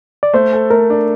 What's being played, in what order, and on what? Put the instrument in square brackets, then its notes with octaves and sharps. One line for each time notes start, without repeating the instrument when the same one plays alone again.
[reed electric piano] D5
[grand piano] A3 [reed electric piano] C5
[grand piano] A4
[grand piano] A3 [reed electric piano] A#4
[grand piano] D4